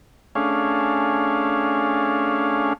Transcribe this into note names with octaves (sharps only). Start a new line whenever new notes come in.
A3 C#4 D4 G#4 F5